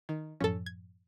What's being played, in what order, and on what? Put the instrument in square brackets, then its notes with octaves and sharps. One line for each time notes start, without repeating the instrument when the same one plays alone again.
[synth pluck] D#3
[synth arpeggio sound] F#2 A2 F3 [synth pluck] C#4 A4
[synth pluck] G#6